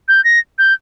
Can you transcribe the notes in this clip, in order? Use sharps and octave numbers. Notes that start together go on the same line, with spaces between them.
G6
A#6
G6